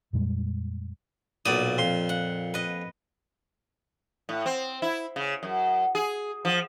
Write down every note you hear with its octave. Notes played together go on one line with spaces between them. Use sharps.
F2 A#2 G3 G#3
B1 A#2 D5 D#6
F2 C6
F#5
B4 D#5
A2
C4
E4
C#3
F#2
G#4
F3